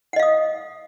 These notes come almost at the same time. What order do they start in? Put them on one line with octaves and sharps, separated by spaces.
F#5 D#5 F5 D#6